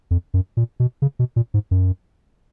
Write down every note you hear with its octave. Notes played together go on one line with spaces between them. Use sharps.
F2
F#2
A#2
B2
C#3
B2
A#2
G#2
F#2